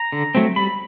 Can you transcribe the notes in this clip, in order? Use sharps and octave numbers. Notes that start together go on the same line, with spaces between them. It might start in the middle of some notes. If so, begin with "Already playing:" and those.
Already playing: A#5
D3
F#3 A3 C4
G3 B5